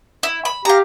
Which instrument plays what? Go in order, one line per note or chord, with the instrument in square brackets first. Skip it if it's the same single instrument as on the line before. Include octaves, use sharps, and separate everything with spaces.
[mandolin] E4
B5
[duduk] G4 [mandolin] F5 A#5